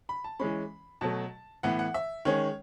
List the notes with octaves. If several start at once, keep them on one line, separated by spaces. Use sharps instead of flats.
B5
A5
E3 G#3 C#4 B5
B2 F#3 A3 A5
A2 E3 B3 F#5
F#5
E5
D#3 G#3 C#4 C#5